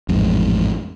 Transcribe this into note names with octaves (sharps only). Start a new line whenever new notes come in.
A1 F2 G#2